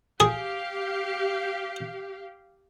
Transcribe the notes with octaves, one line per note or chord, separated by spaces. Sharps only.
G4 G#4 F5